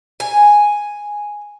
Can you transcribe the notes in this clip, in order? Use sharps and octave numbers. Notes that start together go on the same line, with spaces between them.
G#5